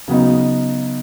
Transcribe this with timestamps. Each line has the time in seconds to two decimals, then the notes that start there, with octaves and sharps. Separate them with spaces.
0.08 C#3 F#3 B3 D#4